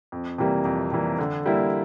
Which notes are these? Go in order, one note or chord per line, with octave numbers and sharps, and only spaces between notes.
F2
C3 E3 G3 A#3
F2
C3 E3 G3 A#3
D3
G3 A#3 E4